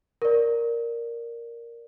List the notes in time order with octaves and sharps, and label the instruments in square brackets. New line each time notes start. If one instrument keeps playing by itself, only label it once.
[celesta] A#4 D5